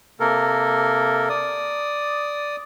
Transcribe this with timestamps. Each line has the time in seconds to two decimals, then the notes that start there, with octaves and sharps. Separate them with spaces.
0.20 C3 A#3 A4 A#4
1.29 D5 D#6